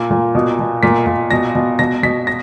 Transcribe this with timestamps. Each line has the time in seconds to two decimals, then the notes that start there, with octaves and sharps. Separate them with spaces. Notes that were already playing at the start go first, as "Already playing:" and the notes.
Already playing: A#2
0.11 A#2
0.35 B2
0.59 B2
0.83 A#2 B6
1.07 A#2
1.31 B2 A#6
1.55 B2
1.79 B2 A#6
2.03 B2 B6
2.27 A#6